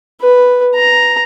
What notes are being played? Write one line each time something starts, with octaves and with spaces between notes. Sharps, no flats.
B4
A#5